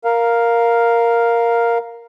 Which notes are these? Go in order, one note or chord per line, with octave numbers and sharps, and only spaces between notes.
A#4 F5